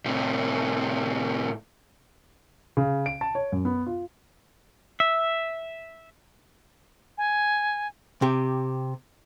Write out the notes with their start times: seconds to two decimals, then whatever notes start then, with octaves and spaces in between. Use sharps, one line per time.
0.06 A2 C3
2.77 C#3
3.06 D7
3.21 A5
3.35 C#5
3.52 F#2
3.65 B3
3.87 F4
5.00 E5
7.18 G#5
8.22 C3 G4